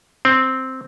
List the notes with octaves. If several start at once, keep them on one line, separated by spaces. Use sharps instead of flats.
C4